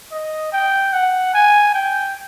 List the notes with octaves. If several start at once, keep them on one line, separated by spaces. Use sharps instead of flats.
D#5
G5
F#5
G#5
G5